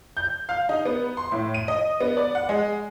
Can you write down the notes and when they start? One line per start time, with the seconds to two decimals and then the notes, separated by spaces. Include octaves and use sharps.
0.17 G6
0.49 F5
0.69 D#4
0.85 B3
1.17 C6
1.32 A2
1.54 D#7
1.68 D#5
2.00 B3
2.17 D5
2.35 F#5
2.49 G#3